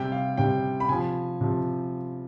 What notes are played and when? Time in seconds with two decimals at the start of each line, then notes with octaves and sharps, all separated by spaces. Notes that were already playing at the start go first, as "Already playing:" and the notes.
Already playing: C3 G3 G5
0.12 F5
0.37 C3 G3 G5
0.80 B5
0.89 C3 F3 G#5
1.41 C3 F3